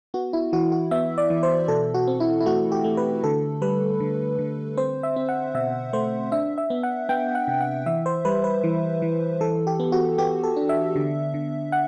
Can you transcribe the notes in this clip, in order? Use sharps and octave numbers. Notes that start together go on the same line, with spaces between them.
B3 F#4
E4
E3 F#4
F#4
B3 E5
D5
E3
C5
B2 A4
F#4
C4
E4
E4
A3 F#4
G4
A3
B4
D3 A4
G3 B4
D3
D3
C4 C5
E5
C4
F#5
B2 E5
A3 C5
D4 E5
E5
B3
F#5
B3 G5
F#5
C3
F#5
E3 E5
C5
G3 B4
B4
E3
E3
E3 A4
G4
B3
F#4
B3 G4
A4
D4
E5
D3
D3
F#5